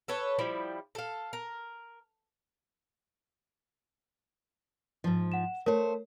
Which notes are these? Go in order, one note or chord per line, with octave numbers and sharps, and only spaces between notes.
A4 B4 C#5
F3 G3 E4
A4 F5
A#4
G#2 F3
F#5 E7
A3 A#4 C5 C#5